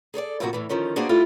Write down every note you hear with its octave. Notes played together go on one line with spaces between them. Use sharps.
G#4 A4 C#5 D5
A2 C3 D#3 F3 A#3 F#4
E2 A2 E3
D3 D#3 F3 C#4
A#3 B3 D4 F#4 G#4 C5
G3 A3 E4 F4